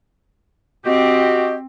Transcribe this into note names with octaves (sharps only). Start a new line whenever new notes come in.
C4 F#4 G4 D#5